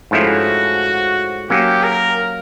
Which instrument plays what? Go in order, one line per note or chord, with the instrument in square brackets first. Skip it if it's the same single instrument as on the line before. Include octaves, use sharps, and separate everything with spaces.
[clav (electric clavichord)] G#2 F3 A3 C#4 E4 [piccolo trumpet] F#4
[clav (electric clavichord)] F#3 A#3 C#4 [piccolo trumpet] G4
[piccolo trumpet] A#4